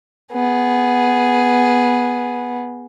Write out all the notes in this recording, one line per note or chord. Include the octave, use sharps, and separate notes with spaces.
B3 G#4